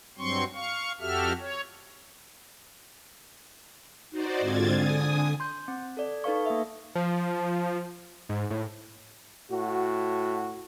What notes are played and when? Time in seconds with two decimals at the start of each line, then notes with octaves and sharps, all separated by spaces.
0.18 G2 F#3 C4 C6 C#6
0.55 F5 C#6
1.00 F2 F#4 G4 A4 E5 F6
1.40 C#5
4.10 D#4 F#4 C5 D5
4.40 G#2 D3 C4 F4 G#6 A6
4.74 D3 G#5 D#6
5.40 C6 G6
5.68 C4
5.97 A4 D5
6.24 D#4 A4 B4 F5 C#6
6.46 A#3 E5
6.95 F3
8.29 G#2
8.50 A2
9.51 A2 F#4